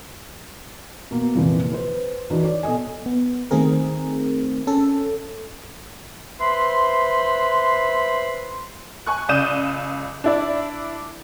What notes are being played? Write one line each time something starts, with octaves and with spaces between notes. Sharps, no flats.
B2 A#3
C2 F2 A#2 E3 F3
B4 C5
E3 D4 D#4 F#4
C#5 D5
B2 A4 D#5 G#5
B3
D#3 A3 C4 G#4 A#4
C#4 A4
B4 C5 E5 B5 C6
G#5 C#6 F#6
C#2 D5 D#6 G6 D#7 E7
D4 E4 D5